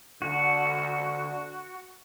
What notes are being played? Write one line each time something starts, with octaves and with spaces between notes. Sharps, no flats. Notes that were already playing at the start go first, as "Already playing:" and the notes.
D3 F#4